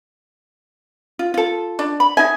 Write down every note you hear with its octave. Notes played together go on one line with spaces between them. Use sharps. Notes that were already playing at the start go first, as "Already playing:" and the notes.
F4
F4 A4
D4
B5
D#4 E5 G#5